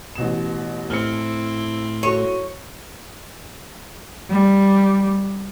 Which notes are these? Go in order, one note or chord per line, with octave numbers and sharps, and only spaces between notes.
A1 B2 E7
A2 A3 C4 E4 F6 C#7
F#4 A4 C#5 D#7
G3